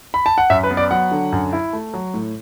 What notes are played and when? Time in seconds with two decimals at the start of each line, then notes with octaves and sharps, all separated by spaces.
0.14 B5
0.26 A5
0.38 F#5
0.50 F#2 E5
0.64 B4
0.71 B3
0.77 D5
0.91 F#3 F#5
1.11 D3
1.32 F#2
1.53 E4
1.73 A3
1.94 F#3
2.14 A2